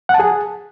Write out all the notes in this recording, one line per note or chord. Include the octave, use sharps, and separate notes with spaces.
F#5
A5
G#4